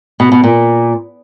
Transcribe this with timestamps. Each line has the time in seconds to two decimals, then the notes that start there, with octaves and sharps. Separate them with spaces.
0.20 B2
0.32 B2
0.44 A#2